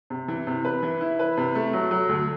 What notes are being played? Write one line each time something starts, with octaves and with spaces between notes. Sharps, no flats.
C3
E3
C3
B4
E3
E4
B4
C3
A3
F#3
F#3
D2